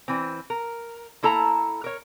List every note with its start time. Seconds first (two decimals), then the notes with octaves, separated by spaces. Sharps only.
0.08 E3 C4
0.50 A#4
1.23 A#3 E4 A4 A5 A#5
1.84 A#4 C#5